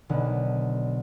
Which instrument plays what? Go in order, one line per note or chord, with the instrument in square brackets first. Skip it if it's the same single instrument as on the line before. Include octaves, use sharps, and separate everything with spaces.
[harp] B1 D3